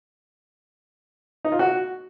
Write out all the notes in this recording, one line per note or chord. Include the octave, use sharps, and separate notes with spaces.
D#4
F4
F#4